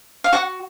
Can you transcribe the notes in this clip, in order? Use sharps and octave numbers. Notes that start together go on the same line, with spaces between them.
F5
F#4 F#5